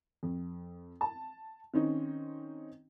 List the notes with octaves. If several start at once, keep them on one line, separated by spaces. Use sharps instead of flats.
F2
A5
D#3 C4 C#4 D#4